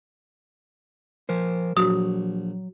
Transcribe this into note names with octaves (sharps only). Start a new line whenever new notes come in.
F3 A#4 C5
A#1 F#3 F#4 D#6